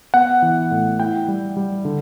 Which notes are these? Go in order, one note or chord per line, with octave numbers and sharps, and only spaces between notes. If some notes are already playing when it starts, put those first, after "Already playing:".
B3 F#5
E3
A2
E4 G5
G3
G3
D3